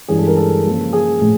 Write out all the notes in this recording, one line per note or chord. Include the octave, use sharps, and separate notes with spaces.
G2 E3 G#3 C#4 E4 G#4
A4
A#4
A4
C#3 F3 A#3
G#4
A2 F3 A3